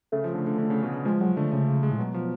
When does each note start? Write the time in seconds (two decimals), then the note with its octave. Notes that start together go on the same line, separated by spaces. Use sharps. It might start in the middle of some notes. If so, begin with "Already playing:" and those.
0.12 C#3 A3
0.24 F3
0.35 D3
0.47 D3
0.58 D3
0.70 C#3
0.83 B2
0.94 C#3
1.05 F3 G#3
1.21 F#3 G#3
1.37 D3 A3
1.52 C#3 A3
1.68 C#3
1.83 C#3 G#3
1.91 A2
1.98 B2 F#3
2.14 F3